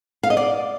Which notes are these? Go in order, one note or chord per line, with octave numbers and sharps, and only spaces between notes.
F5
D#5
D5